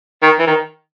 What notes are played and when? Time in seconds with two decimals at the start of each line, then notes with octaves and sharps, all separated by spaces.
0.22 D#3
0.39 E3
0.47 D#3